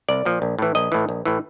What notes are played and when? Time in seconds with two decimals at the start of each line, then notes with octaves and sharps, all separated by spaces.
0.09 C2 D5
0.25 A#2 F3
0.42 A#1
0.59 A2 E3
0.75 A#1 D#5
0.92 A2 E3
1.09 A#1
1.25 A2 E3